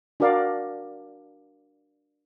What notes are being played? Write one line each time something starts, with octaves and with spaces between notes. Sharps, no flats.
D4 F#4 A#4 D5 F5